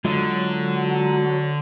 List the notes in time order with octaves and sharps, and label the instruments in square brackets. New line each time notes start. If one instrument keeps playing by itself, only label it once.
[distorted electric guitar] D3 [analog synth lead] F#3 [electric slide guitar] G#3 F4 D#5